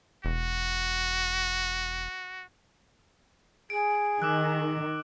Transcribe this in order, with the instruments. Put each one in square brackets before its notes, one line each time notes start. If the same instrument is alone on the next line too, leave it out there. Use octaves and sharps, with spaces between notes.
[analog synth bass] E1 [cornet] F#4
[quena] G#4 [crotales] D7
[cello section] D#3 [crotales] D6 E6 F#6